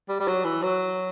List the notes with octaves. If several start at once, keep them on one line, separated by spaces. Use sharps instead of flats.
G3
G3
F#3
E3
F#3